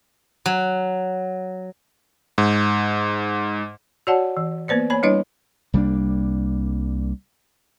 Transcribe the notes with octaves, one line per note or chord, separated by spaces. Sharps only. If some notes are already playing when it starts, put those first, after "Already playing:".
F#3
G#2
F#4 C#5 D5 F#5 A5
E3
A#3 B3 B4 C5 D5
A#3 C#5 G#5 B5
G3 D4 E4 B4 C#5 D#5
C2 G3 A#3 D4